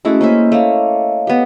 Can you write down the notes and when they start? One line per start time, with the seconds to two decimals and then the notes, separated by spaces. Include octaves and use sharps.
0.05 G#3 A3 C#4 E4 F#4 A4
0.21 A#3 C#4 C5 D#5 E5
0.52 A3 A#3 C#5 D#5 F5
1.27 B3 G4